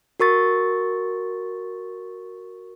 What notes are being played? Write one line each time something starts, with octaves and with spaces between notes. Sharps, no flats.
F#4 A#4 C#6 A6